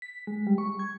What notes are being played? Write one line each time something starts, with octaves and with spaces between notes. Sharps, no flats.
B6
G#3
G3
C#6
G#6